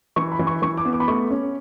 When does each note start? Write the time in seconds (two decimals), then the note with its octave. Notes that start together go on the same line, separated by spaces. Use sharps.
0.16 E3 C#6
0.32 B5
0.39 E3
0.47 C#6
0.62 E3 C#6
0.77 D6
0.85 B3
0.93 D6
1.00 B5
1.08 A3 C#6
1.30 C#4